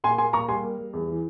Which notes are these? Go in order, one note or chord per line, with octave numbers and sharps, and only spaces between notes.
A#2 G#5 C6
A#3 G#5 C6
A#2 A#5 C#6
G3 G#5 C6
A#3
G3
E2
E3